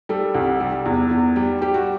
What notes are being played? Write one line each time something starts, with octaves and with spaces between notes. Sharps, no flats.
G3 A4
C2
G3
E2
E2
G3
G3 G4
F#4